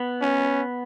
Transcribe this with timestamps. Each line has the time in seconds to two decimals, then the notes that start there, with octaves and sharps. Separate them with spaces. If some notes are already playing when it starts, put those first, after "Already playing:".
Already playing: B3
0.22 C#4